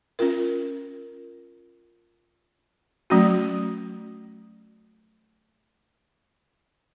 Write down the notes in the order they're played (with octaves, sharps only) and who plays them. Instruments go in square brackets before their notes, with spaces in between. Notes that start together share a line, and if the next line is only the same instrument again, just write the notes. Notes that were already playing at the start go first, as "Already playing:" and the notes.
[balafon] C#4 F4 A#4
F#3 A3 C#4 F#4